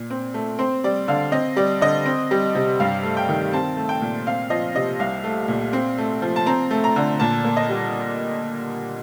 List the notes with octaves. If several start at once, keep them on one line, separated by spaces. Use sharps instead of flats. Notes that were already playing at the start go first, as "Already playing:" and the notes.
Already playing: A#2
C4
A3
C4 C5
G3 D5
D3 F5
C4 D#5
G3 D5
D3 D#5
C4
G3
C3
G2 F5
A3
G5
D#3
C4 A5
A3
G5
A#2
C4 F5
F3 D#5
C3 D#5
C2 F5
A3
A#2
C4
A3
F3
A5
C4 A#5
A3
A#5
D3
A#2 A5
A#3
D#5
G3